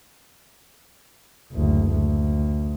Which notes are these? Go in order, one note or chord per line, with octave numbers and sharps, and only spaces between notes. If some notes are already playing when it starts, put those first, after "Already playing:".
F#1 D2
D2